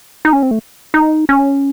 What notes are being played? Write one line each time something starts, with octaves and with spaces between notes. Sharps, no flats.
D#4
C#4
C4
A3
D#4
C#4